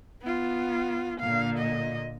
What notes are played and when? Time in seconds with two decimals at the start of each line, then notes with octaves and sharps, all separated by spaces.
0.22 B3 F4
1.20 A#2 D3 F5
1.58 D#5